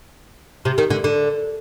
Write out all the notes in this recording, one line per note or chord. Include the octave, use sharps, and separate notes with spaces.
C3
D#3
D3
D3